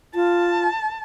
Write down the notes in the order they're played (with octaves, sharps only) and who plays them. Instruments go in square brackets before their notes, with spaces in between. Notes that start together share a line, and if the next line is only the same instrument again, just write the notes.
[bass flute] F4 [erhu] A5